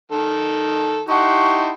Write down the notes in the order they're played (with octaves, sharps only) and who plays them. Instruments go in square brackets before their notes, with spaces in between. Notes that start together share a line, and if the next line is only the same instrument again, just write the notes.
[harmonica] D#3 A4
[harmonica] D#4 E4 G4 [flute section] F#5 A5 C6 [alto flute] C#6